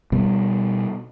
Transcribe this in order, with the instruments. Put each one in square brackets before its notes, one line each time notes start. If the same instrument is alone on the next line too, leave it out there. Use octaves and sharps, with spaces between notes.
[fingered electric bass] B2 G3